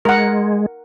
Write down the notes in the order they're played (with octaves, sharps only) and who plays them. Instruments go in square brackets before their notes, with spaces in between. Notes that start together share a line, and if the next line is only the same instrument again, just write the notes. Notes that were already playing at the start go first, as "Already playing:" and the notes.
[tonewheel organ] G#3 [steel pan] A#4 F#5